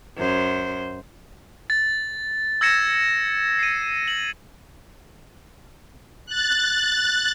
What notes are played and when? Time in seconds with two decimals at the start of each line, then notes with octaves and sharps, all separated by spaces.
0.17 F#2 C5
1.70 A6
2.61 E6 G#6 A#6 C#7 E7
3.59 C7 D#7
4.08 F#7
6.26 F#6 A6